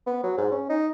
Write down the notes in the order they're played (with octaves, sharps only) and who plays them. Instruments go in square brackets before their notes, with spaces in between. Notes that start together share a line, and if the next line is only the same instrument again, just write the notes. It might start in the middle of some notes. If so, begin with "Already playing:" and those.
[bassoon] B3
F#3
G#2
C#4
D#4